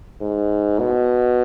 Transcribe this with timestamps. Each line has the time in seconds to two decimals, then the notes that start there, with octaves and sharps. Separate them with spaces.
0.21 G#2
0.79 B2